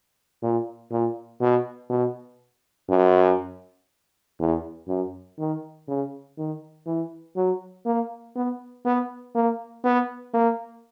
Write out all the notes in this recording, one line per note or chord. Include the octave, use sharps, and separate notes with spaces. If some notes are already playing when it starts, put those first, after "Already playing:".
A#2
A#2
B2
B2
F#2
E2
F#2
D#3
C#3
D#3
E3
F#3
A#3
B3
B3
A#3
B3
A#3